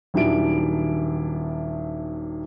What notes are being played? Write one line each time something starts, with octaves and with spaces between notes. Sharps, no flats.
D#1 D#3 F#3 D4 E4 D7